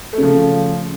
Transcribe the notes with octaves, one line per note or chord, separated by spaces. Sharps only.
C#3 F3 A3